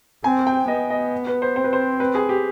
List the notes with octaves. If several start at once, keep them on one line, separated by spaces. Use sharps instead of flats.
C4 G#5
G5
B3 D#5
D#5
B4
C5
C4 C5
B4
C5
B4
G#4
G4